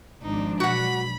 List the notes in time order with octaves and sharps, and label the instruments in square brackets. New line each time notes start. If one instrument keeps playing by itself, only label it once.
[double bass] G#1 [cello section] F3 G#3 D4 [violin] D#4
[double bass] B2 F#3 [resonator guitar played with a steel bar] F#4 F#5 [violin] B5